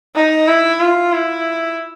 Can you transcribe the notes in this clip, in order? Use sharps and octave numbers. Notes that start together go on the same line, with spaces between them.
D#4
E4
F4
E4